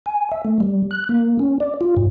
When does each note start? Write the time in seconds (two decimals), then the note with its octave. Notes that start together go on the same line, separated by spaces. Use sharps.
0.06 G#5
0.31 E5
0.45 A3
0.60 G3
0.91 F#6
1.09 A#3
1.39 C#4
1.60 D5
1.81 F4
1.97 G#2